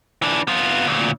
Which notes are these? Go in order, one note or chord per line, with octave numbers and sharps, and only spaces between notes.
E3 D4
B3 F4
D2 A#2